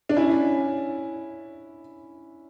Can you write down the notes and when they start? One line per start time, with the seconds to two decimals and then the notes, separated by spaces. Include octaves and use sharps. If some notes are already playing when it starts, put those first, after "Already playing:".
0.09 D4
0.17 C#4 E4